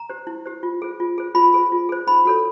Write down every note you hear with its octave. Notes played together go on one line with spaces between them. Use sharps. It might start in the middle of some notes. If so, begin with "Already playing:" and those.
Already playing: A#5
G4 C5
E4
G4 C5
F4
G#4 C5
F4
G#4 C5
F4 B5
G#4 C5
F4
G#4 C5
D#4 B5
F#4 A4 C#5